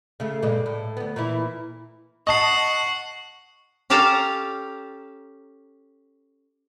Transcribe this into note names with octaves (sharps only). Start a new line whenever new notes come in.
C#3 A3
G2 A#2 G#3
A2
D2 B3
A#2 E3 E4
D#5 F#5 A5 C#6 C7
C#4 G4 A4 F5 A5 A#5